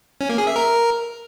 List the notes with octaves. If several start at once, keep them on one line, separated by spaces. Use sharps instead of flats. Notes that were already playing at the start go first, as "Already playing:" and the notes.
C#4
A#3
G#4
E5
A#4